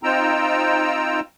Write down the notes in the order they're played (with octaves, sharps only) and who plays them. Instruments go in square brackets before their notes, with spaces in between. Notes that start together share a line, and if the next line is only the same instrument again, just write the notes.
[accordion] C4 D#4 F4 G5 A#5 E6